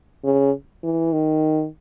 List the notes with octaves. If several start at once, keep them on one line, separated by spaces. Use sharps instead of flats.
C#3
E3
D#3